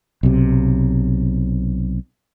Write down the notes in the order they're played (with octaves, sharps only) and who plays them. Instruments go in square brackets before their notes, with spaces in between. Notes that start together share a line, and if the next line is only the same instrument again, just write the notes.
[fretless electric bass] B1 C3